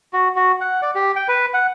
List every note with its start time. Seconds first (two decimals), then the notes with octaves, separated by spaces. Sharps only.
0.13 F#4
0.36 F#4
0.61 F#5
0.82 D5
0.95 G4
1.16 G5
1.28 B4
1.54 F#5